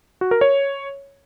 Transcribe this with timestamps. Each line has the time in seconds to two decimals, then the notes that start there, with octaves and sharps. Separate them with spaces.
0.21 F#4
0.31 A#4
0.41 C#5